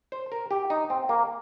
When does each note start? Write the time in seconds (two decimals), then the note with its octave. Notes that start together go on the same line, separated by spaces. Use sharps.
0.12 C5
0.32 A#4
0.51 G4
0.70 D#4
0.90 C4
1.09 A#3